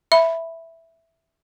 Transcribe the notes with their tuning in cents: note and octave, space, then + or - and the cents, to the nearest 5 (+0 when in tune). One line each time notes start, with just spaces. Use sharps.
E5 +0 B5 +0